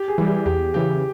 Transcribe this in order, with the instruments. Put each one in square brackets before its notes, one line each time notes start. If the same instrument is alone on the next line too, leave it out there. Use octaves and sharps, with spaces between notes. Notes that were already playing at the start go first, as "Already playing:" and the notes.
Already playing: [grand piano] G4
G#4
[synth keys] E3 G3
[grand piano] G4
[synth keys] E2 [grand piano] G4
[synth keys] C#3 E3 [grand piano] G4